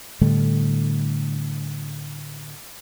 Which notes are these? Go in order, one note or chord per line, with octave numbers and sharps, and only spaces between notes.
A2 D3 G3 A3